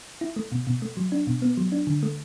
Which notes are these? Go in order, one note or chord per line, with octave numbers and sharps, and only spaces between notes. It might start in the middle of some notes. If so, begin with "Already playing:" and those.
E4
A3
B2
B2
A3
F#3
D4
B2
B3
F#3
D4
D3
A3